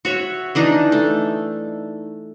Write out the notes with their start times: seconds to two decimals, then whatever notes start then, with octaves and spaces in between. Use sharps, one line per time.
0.05 F#4 C#5 E5
0.55 E3 D4 D#4
0.92 A3